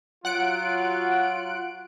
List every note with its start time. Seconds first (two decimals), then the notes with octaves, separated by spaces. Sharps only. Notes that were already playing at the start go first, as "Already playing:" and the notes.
0.25 F#3 F4 F#5 F#6 D7